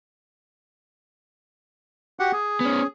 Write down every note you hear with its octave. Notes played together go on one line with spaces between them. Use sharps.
F#4 G4 F#5
G#4
B3 C#4